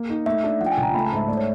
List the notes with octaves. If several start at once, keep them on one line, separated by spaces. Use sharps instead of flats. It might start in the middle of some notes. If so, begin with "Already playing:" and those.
Already playing: A#3
D#4
A3 E5
D4
F3 F#5
G5
G#5
C#2
A#5
A3 B5
A5
G#2 E5
A3 D5
C#5